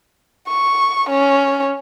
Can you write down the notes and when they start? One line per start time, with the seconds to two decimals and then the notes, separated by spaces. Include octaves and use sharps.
0.48 C#6
1.10 C#4